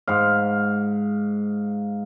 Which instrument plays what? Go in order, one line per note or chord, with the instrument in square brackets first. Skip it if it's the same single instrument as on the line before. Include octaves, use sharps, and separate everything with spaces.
[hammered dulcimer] G#2 F5